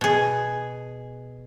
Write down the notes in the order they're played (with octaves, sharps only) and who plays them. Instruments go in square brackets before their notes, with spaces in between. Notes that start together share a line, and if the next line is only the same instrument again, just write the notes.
[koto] B2 G#4